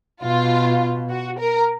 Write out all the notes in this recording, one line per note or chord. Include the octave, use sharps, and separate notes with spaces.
B2 F4
F#4
A#4